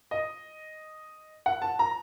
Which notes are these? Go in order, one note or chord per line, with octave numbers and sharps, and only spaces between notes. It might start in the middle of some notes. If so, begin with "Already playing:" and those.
D#5
F#5
A5
A#5